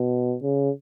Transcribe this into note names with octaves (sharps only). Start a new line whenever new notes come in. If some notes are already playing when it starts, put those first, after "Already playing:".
Already playing: B2
C#3